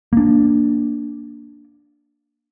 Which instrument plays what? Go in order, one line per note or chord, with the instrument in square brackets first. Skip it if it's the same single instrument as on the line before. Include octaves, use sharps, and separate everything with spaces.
[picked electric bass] A#3 D4